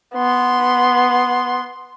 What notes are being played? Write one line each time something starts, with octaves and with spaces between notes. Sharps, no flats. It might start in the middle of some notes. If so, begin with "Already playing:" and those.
B3 C6